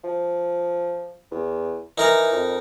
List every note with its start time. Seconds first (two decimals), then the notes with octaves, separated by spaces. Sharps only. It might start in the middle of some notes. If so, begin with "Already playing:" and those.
0.04 F3
1.31 E2
1.98 E3 D#4 A#4 A#5
2.32 F2